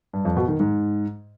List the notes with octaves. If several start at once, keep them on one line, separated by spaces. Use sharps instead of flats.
G2
F2
B2
D#3
G#2